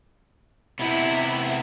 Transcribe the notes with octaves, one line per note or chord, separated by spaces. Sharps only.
C3 B3 E4